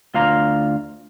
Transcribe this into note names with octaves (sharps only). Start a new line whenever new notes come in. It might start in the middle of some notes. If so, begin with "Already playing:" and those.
D2 F4 F5 A#5